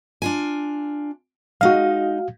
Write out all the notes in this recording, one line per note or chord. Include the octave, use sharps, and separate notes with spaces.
D4 F4 G#5
G#3 D#4 F#4 F5